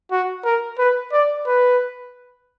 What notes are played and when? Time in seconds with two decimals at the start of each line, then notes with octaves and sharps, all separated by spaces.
0.11 F#4
0.45 A#4
0.79 B4
1.13 D5
1.47 B4